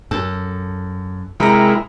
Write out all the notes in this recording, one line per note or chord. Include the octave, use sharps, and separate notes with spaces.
F#2 A4
C3 G#3 E4 A#4 G5 A#5